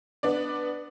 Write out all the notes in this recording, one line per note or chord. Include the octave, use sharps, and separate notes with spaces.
B3 D4 D5